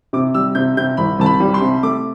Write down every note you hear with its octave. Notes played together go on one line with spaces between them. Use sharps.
C3 D6
G3 E6
C3 G6
C3 G6
C2 B5
C2 A5
B5
G3
C6
C3
A3 D6